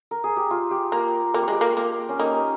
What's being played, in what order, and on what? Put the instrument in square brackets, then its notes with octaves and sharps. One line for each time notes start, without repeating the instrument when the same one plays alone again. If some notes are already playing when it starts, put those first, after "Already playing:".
Already playing: [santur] C5
A#4
G#4
G4
F4
G4
[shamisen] A#3 [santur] A#4
[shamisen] A#3 [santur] G4
[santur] F4
[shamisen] G#3 [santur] G4
[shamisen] A#3
A#3
[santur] C#4
[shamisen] A#3 [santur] D#4